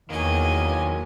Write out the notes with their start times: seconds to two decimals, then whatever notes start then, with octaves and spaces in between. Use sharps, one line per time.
0.10 E2 D#3 F#3 A#3 D#5 G#5